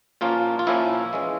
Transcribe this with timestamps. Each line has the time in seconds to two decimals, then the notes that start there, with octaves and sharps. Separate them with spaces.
0.21 A#2 F3 A#3 C#4 F4
0.59 F4
0.67 A#2 F3 A#3 C#4 E4
1.13 E3 G#3 C#4